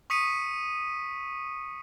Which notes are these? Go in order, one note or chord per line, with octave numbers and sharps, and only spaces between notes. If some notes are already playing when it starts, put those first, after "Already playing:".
C#6 D#6 B6 C#7 D#7